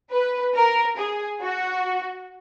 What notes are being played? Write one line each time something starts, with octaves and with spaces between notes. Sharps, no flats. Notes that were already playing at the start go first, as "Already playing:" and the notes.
B4
A#4
G#4
F#4